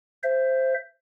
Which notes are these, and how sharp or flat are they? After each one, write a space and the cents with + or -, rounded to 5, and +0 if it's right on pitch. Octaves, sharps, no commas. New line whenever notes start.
C5 +0 E5 +20